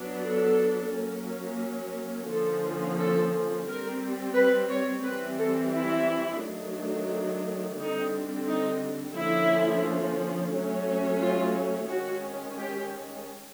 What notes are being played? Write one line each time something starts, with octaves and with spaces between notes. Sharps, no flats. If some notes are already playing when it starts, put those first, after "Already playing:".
Already playing: F#3 B3 D4
A4
F#3 A#3 C#4
D3 F3 A#3 C#4 A4
A4
G3 C4 A#4
B4
C#5
E3 G3 C4 B4
A4
E4
D#3 F#3 A3 D4
D3 G3 C4 D#4
D#4
D3 F3 A#3 C#4 E4
F#3 A3 C#4
F4
D#3 G#3 C#4 F#4
G4